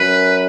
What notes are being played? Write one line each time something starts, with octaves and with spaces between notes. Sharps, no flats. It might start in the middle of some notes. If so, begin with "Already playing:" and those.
Already playing: F#2 B4